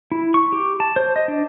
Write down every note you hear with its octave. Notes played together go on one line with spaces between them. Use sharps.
E4
C#6
G4
A5
C5
D#5
D4